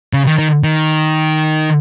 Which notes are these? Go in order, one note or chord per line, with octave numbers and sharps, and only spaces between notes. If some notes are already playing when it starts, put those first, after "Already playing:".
C#3
D#3
D#3
D#3